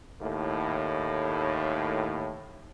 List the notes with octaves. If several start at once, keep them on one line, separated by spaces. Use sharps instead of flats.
D#2 A2